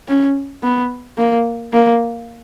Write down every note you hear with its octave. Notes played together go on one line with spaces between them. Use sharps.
C#4
B3
A#3
A#3